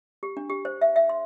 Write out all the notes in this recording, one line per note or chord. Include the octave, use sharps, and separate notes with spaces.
G4
D4
G4
C5
E5
E5
C6